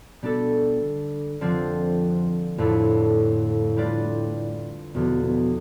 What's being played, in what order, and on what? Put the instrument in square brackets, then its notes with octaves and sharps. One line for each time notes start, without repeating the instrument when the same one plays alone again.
[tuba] B2 [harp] G3 D4 A4
[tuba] D3
[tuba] F2 [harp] D3 F3 C4
[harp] F2 D3 A3 E4 [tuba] A2
[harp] G3 D4 F4 B4 D5
[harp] E2 D3 F3 [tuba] B2
[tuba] B2